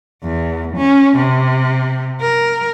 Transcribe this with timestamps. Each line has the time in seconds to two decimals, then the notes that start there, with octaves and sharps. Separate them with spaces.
0.23 E2
0.76 C#4
1.16 C3
2.21 A#4